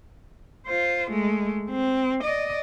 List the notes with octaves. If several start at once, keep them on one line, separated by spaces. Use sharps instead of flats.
F4 C5
G#3 A3
C4
D5 D#5